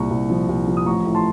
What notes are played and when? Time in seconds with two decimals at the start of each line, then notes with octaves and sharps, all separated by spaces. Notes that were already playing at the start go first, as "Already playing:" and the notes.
Already playing: C2 A#2 A#5 C#6
0.10 C2
0.30 F3
0.49 C2
0.67 F3
0.77 D#6
0.86 A1 A#5 C#6
1.05 A2
1.15 A5 C6